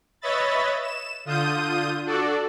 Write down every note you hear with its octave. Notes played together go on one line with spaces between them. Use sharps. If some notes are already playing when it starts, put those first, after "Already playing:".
B4 C#5 D#5 E5 B5 A6
E7
D3 F4 D#6 G6 D#7
D4 F#4 A4 D5